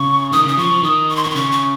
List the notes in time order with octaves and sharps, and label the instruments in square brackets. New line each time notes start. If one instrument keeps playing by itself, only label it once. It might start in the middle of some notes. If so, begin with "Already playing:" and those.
Already playing: [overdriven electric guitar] C#3 [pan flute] C#6
[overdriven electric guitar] D#3 [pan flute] D#6
[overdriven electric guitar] C#3 [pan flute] D#6
[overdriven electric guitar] F3 [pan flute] C#6
[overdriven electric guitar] F3
[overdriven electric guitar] D#3 [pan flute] D#6
[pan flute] C#6
C6
C#6
[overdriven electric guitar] D#3
[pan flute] C6
[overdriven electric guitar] C#3 [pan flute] C#6
[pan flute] C#6